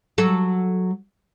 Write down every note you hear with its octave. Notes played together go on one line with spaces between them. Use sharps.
F#3 A4